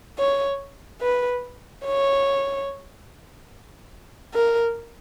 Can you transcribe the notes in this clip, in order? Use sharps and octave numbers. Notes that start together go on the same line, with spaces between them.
C#5
B4
C#5
A#4